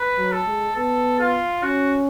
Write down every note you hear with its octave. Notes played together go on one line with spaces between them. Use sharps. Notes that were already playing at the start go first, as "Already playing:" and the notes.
Already playing: B4
F#3
A4
G#3
B3 A4
F4
C#4 F#4